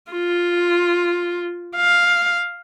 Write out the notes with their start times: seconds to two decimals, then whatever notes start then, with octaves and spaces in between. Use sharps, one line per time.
0.12 F4
1.76 F5